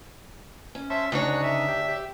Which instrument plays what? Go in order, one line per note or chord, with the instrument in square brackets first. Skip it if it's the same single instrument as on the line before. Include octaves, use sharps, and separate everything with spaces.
[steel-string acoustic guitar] C#4
[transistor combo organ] C5 C#5 A5 [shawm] E5
[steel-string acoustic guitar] D2 D4 C#5 [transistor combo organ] C#3 D#4 [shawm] F#4
[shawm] E5
[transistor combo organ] G4
G4